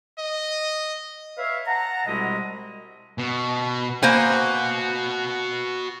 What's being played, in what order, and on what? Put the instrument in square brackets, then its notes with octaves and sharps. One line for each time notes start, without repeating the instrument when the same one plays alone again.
[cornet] D#5
[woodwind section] B4 C#5 E5 F5
F#5 A5 A#5
C2 B2 G3 G#3 E4 D#5
[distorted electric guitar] B2
[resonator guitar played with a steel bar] A#3 C5 G#5 [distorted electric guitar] F#4 B4